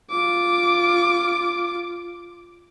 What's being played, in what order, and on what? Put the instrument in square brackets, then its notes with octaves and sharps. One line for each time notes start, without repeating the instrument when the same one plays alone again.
[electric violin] F4 D6